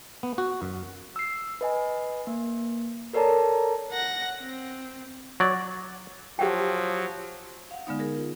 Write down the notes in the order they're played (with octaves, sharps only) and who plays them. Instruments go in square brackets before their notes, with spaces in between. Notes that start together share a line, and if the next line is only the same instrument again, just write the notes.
[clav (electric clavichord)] B3
F#4
F#2
[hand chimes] E6 C7
B4 D#5 G#5
A#3
A4 A#4 C#5 D5 A5 A#5
[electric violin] F#5 A#6
C4
[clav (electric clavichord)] F#3 D5
[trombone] F3 [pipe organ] F#3 [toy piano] G4 F#5 G5
[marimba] F5 F#5
D3 G#3 B3 D#4
G#4 A#4
F4